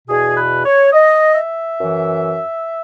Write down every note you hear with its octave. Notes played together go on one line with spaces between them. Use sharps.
E2 B2 G#4
B4
C#5
D#5
E5
F#2 E3